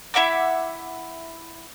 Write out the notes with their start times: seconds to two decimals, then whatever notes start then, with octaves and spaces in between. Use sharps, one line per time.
0.14 E4 E5 F#5 D6